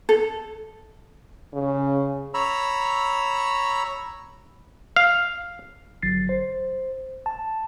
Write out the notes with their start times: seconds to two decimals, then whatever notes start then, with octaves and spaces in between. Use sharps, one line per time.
0.09 A4
1.53 C#3
2.34 C#5 A#5 B5 E6
4.96 F5
6.03 G1 F#3 A6 C7
6.29 C5
7.26 A5